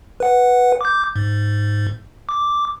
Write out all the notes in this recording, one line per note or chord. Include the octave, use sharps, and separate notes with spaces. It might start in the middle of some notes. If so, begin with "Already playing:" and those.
B4 F#5
D6 G6
G#2
D6